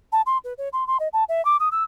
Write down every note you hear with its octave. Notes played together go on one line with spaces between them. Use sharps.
A5
C6
B4
C#5
C6
C6
D#5
A5
E5
D6
D#6
E6